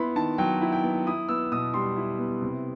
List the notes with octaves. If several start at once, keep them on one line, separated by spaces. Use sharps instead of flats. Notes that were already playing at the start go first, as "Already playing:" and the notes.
Already playing: B3 E4 B5 C6
D#3 A5
F#3 G5
E4
G5
B3
E4 D#6
B3 E6
B2 D#6
G3 C6
E4
B3
C3